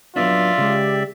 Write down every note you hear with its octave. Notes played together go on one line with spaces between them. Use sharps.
F#3 B3 D4 F4 D5 E5
C#3 G#3 G4